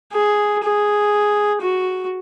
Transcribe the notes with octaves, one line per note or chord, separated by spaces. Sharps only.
G#4
G#4
F#4